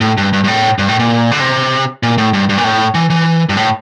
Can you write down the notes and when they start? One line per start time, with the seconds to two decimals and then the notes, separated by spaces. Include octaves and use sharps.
0.01 A2
0.18 G2
0.33 G2
0.44 G2
0.48 A2
0.79 G2
0.89 A2
0.99 A#2
1.32 D3
1.40 C3
2.03 A#2
2.18 A2
2.33 G2
2.49 G2
2.58 A#2
2.64 A2
2.95 E3
3.10 E3
3.49 G2
3.57 A2